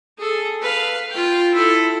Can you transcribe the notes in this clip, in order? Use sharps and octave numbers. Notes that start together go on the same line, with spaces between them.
G#4 A4
B4 F5
F4 G5
E4 A4